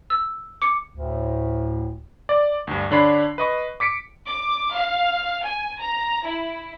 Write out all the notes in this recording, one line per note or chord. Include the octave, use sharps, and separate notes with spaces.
E6
D6 C#7
D2 A2
D5
D2 G2
D3 D4 C#5 B5 C7
B4 D#5 C#6
D6 B6 C#7 D7
D6
F5
G#5
A#5
E4